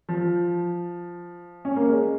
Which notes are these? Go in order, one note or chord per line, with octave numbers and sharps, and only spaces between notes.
F3
C#4
A#3
G#3